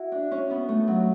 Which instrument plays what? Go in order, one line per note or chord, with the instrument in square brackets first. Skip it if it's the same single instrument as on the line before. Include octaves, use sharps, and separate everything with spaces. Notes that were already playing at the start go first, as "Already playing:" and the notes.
Already playing: [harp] E4 F#4
D4
C#4
B3
A3
F#3